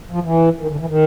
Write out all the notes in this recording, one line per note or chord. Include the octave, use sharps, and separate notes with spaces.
F3
E3
D#3
D3
E3
D#3